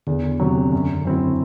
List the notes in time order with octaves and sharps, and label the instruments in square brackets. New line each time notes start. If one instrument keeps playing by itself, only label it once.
[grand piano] E2 [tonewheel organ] D3
[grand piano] C3 F#3
F#2
F#3 C4 E4